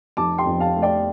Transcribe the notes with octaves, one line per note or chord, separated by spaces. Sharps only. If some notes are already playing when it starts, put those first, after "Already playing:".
F1 A5 D6
G5 C6
F2
F5 A5
A3
D5 G5